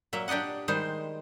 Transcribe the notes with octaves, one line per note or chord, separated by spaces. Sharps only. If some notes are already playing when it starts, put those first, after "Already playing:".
A#2 F#3 A#3 E5
D4 G4 D5 D#5 F#5
D#3 G3 G#3 D#4 C5